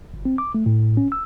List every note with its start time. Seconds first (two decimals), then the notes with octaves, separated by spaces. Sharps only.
0.14 G1
0.25 C4
0.38 D6
0.55 A3
0.66 A2
0.97 C#4
1.12 E6